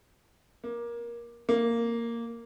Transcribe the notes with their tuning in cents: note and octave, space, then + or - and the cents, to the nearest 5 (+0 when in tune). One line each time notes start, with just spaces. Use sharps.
A#3 +20
A#3 -5